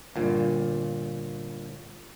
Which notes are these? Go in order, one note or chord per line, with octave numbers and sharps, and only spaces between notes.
G1 A#2